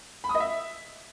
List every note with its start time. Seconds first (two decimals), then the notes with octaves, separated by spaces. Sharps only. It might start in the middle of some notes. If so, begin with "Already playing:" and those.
0.24 B5
0.29 D#6
0.35 D#5
0.40 E5